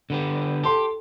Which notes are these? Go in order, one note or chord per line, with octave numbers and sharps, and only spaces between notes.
D3 B3 G4
G4 A4 C6